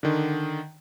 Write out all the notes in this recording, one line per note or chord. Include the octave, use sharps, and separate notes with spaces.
D3 D#3